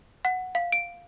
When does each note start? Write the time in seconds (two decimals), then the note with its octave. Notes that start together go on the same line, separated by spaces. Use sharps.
0.25 F#5
0.55 F5
0.72 D7